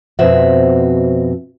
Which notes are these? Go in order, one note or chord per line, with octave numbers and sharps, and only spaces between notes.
F2 B2 C4 F#4 E5